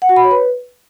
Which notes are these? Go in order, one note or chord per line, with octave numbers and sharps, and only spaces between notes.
F#5
F#4
B5
C#5
B4